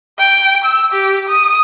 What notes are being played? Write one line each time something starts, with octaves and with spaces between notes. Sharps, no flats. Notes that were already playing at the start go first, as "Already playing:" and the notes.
G5
E6
G4
D#6